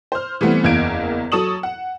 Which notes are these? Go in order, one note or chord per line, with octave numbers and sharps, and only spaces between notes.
C5 F6
E3 G3 A3 B3 C4
F#1 E2 A#3 G#6 D7
F#3 A4 C#6 D#6 E7 F#7
F#5